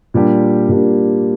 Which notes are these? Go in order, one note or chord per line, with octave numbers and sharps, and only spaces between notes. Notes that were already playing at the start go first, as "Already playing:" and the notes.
A#2 G3 A#3 D4 G4
A#2 G3 A#3 D4 G4